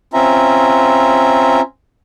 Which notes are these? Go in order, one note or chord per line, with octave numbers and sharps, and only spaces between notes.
C4 C#4 F4 E5 A#5